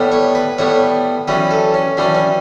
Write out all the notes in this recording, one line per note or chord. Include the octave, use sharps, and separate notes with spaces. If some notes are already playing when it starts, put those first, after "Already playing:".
Already playing: A2 G3 B3
C#5
B4
A2 G3 B3 C#5
F#2 E3 G3 C#4 B4
A4
C#4
F#2 E3 G3 C#4 D4
C#4